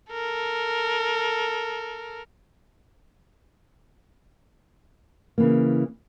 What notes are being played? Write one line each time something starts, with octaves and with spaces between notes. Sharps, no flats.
A4 A#4
C#3 E3 A#3